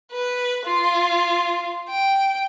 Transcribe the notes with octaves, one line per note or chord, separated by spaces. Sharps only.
B4
F4
G5